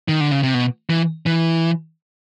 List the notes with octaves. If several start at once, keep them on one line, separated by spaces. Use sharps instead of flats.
D#3
D3
C#3
C3
B2
E3
E3